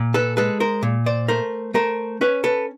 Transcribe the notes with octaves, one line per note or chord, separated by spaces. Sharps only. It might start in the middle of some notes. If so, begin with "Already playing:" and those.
Already playing: A#2
A4 B4
G#3 A4 B4
A#4 C5
A#2
C5 D5
A3 A#4 C5
A3 A#4 C5
C#4 B4 C#5
A4 B4